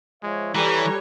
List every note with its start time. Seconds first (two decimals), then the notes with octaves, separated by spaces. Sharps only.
0.23 F3 G#3 C#5 E5
0.55 E3 G3 A4 B4 C#5 G#5 A#5